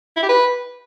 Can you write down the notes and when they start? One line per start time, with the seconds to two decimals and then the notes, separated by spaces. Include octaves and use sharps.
0.17 E4
0.23 G4
0.29 B4